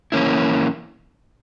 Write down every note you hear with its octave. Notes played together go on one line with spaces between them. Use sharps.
E3 A#3 C#4 E4